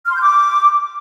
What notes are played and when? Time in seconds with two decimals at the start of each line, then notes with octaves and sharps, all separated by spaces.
0.05 F6
0.11 C6
0.16 G6
0.21 D6